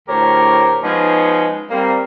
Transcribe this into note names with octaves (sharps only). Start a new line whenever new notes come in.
D2 A2 G4 A#4 C5 C#5
F3 G#3 B3 C#4 D#4
G3 A#3 C4